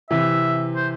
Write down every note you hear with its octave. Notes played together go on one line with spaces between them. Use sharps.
C3 E3 E5
C5